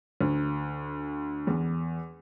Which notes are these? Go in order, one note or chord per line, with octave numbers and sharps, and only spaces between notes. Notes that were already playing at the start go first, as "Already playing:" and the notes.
D2
E2